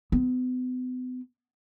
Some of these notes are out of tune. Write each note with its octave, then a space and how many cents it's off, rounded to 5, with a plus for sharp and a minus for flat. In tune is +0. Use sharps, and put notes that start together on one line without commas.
B3 +40